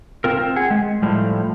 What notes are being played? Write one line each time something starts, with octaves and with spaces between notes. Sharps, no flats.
C4 F4 A#4
C4
G#4 F#5
G#3
A2 F3 G3